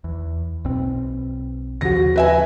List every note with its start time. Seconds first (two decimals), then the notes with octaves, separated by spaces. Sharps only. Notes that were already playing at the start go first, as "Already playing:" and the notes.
0.04 E2
0.64 B1 B2 C4
1.81 D#2 C#3 F3 F#4 A#6
2.16 B4 E5 G#5